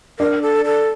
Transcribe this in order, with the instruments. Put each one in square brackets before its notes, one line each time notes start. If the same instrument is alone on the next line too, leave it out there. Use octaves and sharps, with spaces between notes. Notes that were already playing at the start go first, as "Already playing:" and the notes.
[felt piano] D4 D5 [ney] A#4
[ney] A4
A4